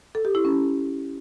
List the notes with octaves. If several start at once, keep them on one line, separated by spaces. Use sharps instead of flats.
A4
G4
E4
C#4